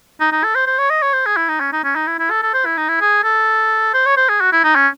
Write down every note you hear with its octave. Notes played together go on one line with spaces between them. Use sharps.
D#4
D#4
A4
C5
C5
C#5
D#5
C#5
C5
G#4
E4
D#4
C#4
D#4
C#4
D#4
E4
E4
A4
A4
C5
E4
D#4
E4
G#4
A4
C5
C#5
C5
G#4
F#4
E4
D#4
C#4